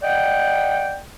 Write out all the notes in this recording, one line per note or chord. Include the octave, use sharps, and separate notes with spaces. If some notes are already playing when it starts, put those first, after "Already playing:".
D5 D#5 F#5 G5